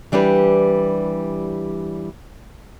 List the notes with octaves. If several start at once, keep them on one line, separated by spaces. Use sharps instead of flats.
E3 G3 D4 G4 B4